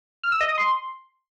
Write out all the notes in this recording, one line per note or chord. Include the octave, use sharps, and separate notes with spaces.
F6
E6
D#5
D#6
C6